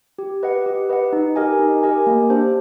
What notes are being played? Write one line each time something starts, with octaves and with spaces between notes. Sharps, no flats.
G4
B4 D#5 F#5
G4
B4 D#5 F#5
D#4
G4 A#4 D#5 G#5
D#4
G4 A#4 D#5 G#5
A#3
D4 G4 C5